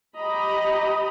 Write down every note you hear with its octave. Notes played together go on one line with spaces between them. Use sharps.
G4 D#5 A#5 B5